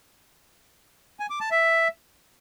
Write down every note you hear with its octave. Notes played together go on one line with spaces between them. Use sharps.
G#5
D6
A5
E5